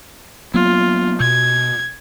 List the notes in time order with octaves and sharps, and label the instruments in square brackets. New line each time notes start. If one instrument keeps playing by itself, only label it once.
[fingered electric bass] F#3 A#3 B3 [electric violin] F4
[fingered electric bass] B2 [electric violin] G#6